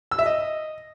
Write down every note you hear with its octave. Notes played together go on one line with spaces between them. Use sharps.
E6
E5
D#5